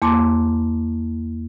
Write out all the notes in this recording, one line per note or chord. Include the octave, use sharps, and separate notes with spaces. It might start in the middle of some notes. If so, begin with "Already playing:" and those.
E2 A#3 A5 C6 D6